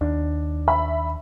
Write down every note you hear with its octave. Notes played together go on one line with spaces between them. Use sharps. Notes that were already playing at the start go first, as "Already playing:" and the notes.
D#2 D4
E5 B5